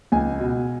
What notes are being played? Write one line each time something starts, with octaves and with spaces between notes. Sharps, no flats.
C#2 G#5
B2